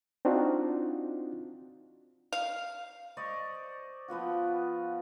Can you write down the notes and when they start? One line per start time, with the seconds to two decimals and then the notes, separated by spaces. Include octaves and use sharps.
0.25 C4 D4 D#4 F4 F#4
2.33 F5
3.17 C5 D5 D#5 C#6
4.08 F3 B3 F4 F#4